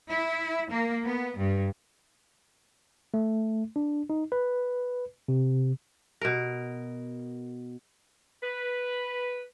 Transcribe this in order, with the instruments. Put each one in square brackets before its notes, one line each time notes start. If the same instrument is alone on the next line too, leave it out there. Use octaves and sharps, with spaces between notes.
[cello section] E4
A#3
B3
G2
[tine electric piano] A3
D4
D#4
B4
C3
[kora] B2 A#4
[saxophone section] B4